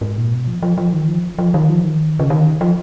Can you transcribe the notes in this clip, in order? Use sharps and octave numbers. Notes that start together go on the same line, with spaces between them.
G#2
A#2
B2
F3
F3
F3
D#3
F3
F3
D#3
F3
D#3
C#3
D#3
F3